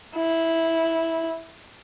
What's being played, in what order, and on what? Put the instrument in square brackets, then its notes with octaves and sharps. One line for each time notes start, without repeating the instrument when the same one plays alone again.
[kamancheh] E4